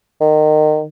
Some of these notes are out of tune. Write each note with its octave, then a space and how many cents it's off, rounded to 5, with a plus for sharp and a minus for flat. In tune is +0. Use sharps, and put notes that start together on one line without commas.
D#3 -25